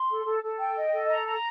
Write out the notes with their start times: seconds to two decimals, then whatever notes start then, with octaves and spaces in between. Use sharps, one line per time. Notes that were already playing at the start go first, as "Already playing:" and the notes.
Already playing: C6
0.09 A4
0.24 A4
0.42 A4
0.58 G5
0.75 D#5
0.93 A4
1.09 A#5
1.26 A#5